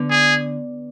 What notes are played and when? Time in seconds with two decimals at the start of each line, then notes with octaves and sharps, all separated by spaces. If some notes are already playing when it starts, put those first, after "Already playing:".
Already playing: D3 B3
0.10 G#4